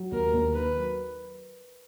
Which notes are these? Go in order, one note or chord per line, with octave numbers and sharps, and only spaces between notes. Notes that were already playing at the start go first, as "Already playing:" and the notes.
Already playing: F#3
D#2 A#4
D#2
D#3 B4
F#3